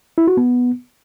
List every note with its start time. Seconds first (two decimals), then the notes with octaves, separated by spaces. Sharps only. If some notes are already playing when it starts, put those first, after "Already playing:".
0.18 E4
0.27 F#4
0.37 B3